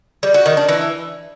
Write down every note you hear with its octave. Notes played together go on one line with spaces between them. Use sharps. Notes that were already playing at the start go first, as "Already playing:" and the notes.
G3
F#4
D#3
D4
E3